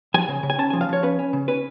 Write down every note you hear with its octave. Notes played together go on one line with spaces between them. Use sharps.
F3 G#5
C#3
C#3
G#5
C#4 A5
F3 G#5
F5
F3 C#5
C#4 B4
C#4
C#3
C#4 B4